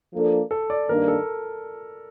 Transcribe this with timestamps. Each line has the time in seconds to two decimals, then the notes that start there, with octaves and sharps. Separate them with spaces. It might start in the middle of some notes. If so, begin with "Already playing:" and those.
0.12 F3 A#3 D4 A4 D5
0.51 A4
0.70 D5
0.89 G2 D#3 A#3 D4 A#4
1.08 A4